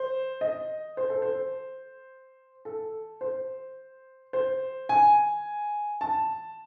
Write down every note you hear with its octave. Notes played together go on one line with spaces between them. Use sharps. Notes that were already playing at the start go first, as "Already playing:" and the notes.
Already playing: C5
D#5
C5
A4
C5
A4
C5
C5
G#5
A5